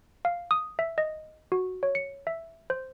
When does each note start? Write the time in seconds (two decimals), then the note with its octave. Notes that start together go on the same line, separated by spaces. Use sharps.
0.25 F5
0.51 D#6
0.79 E5
0.98 D#5
1.52 F#4
1.83 C#5
1.95 C#7
2.27 E5
2.70 C5